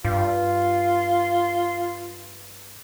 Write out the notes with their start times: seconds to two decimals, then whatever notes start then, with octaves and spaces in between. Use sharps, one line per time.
0.05 G2 F4